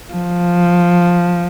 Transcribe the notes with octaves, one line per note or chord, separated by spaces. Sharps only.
F3